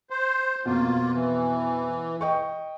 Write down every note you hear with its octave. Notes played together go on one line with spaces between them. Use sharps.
C5
F2 B2 A#3 F4
E3
D#5 G5 C#6